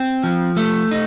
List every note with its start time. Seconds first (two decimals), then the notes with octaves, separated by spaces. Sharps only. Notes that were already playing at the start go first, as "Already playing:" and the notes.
Already playing: C4
0.24 F3
0.57 A3
0.91 D#4